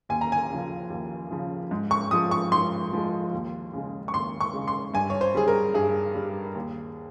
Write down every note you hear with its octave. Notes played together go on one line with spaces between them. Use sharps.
D#2 G#5
A#5
G#5
C#3 F3
D#2
C#3 F3
G#2
C#6
F3 G#3 D#6
C#6
G#2 C6
F3 G#3
D#2
C#3 G#3
C#6
D#2 C6
C#6
C#3 G#3
C6
G2 G#5
C#5
C5
G3 G#4
A#4
G2 G#4
G3
D#2